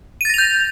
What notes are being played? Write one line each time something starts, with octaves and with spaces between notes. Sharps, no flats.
G6 A6 A#6 D#7 F7